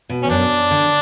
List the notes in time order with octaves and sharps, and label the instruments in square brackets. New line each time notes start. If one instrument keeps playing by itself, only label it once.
[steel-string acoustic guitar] B2
[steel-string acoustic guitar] E2 [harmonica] C#4
[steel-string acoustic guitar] F#2 [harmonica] D4
[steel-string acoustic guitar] D3